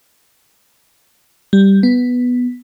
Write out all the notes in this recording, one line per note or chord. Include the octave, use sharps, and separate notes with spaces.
G3
B3